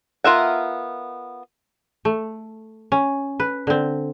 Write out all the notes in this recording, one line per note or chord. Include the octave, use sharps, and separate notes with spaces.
B3 F4 A#4 E5 F#5
A3
C#4
B4
D3 C4